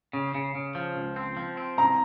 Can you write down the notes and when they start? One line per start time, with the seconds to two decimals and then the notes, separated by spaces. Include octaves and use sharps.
0.13 C#3
0.35 C#3
0.55 C#3
0.75 F3
0.96 C#2
1.16 C4
1.37 F3
1.57 C4
1.77 C2 A#5